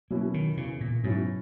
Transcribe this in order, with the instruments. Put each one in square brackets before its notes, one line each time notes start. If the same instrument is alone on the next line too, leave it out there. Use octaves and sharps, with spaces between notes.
[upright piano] B2 F#3 C#4 E4 [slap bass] A#3
[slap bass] D#3
[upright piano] E2 [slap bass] C#3
[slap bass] A#2
[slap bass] G#2 [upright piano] B2 F#3 C#4 E4